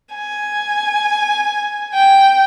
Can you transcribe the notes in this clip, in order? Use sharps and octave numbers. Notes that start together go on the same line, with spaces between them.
G#5
G5